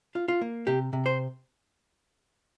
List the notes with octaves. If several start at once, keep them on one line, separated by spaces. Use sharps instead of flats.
F4
F4
A#3
C3 G4
C3
C5